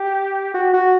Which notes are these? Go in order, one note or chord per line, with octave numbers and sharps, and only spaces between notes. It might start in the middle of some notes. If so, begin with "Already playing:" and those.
Already playing: G4
F#4
F#4